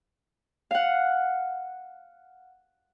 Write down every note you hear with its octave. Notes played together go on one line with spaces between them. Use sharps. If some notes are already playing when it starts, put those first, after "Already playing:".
F5 F#5